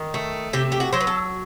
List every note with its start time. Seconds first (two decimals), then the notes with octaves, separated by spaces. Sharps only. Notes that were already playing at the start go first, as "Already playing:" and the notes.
Already playing: D#3
0.14 A3
0.53 C3 G4
0.72 G4
0.80 F#4
0.93 F#3 C5
1.00 B4
1.07 A4